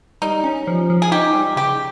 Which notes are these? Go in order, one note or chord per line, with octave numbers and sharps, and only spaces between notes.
G3 D#4
C#4
F3
F3
G#4
D#4 G4
G3
C#3 G4